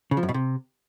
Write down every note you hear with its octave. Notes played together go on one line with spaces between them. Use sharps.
C#3
F3
F#2
B2
C3